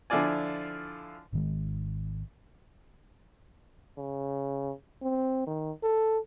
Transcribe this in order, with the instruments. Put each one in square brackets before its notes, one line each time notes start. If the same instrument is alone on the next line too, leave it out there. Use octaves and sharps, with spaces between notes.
[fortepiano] D3 F3 E4 F4 D5 G#5
[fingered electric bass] G#1 D#3 G#3
[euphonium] C#3
C4
D#3
A4